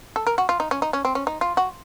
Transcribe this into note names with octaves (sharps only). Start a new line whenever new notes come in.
A4
A#4
F#4
F4
D#4
C#4
D#4
C#4
C4
C#4
D#4
F4
F#4